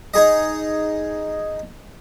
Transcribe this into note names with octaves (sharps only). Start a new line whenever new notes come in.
D#4 G#4 D#5